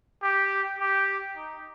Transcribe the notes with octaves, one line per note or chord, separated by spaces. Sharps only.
G4
G4
D#4